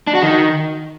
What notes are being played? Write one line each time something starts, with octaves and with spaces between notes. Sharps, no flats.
D4
F#4
D#3